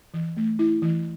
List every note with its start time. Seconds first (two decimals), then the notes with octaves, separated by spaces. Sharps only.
0.14 E3
0.37 A3
0.59 E4
0.82 E3